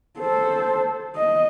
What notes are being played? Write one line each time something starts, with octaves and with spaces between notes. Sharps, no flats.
A4 C5
D#5